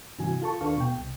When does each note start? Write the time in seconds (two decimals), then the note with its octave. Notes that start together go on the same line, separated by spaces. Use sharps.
0.18 G2 C3 E3 F#4 G#5
0.42 F4 A4 A5 C#6
0.61 D#2 D4 A4 B4 F5 C#6
0.77 B2 G5
0.96 C2